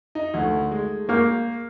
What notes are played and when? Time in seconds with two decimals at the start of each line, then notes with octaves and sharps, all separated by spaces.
0.15 D#4
0.34 D2 D#3 A3
0.71 G#3
1.09 A#3 C#6 F6 G6